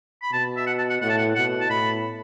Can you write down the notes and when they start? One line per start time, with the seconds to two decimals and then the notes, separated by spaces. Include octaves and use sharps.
0.22 B5
0.32 B2 A5
0.57 E5
0.67 F#5
0.78 A5
0.90 F#5
1.02 A2 F#5
1.09 A5
1.18 F#5
1.35 B2 F#5
1.60 A5
1.70 A2 B5